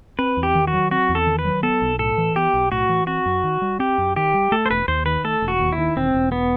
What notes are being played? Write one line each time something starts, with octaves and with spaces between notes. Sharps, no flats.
C4 B4
E2
G4
D#3
F#4
F#3
C4 F#4
E2
A4
D#3
B4
F#3
B3 A4
B1
A2 A4
E3
B3 G4
B1
A2 F#4
E3
C4 F#4
F#2
D#3
G3
C4 G4
F#2
D#3 G4
G3
A3 A4
C5
E1 B4
D#2 C5
D#3 B4
A3 A4
E1
F#4
D#2
E4
D#3
E1 C4
E1
B3